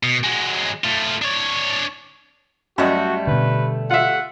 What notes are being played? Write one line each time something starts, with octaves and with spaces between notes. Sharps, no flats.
B2
F#3 G#3
A3 F4
D4 C#5
F#2 G3 A3 F#4 D#5
B2 D3 B4
F4 E5 F#5